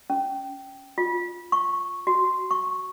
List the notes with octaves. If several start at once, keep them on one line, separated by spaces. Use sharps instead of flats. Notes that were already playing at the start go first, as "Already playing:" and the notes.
C#4
F4
C#6
F#4
C#6